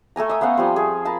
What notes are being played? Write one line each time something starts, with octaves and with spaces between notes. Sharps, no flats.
A3 A4 G#5 A#5
E5 D#6
B3 C#4 F5 F#5
F3 G3 C4
G#4
A#4 A5 B5